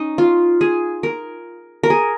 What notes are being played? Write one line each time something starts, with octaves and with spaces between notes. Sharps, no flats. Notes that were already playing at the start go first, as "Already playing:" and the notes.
Already playing: C#4 D#4
F4
G#4
A#4
A#4
G#4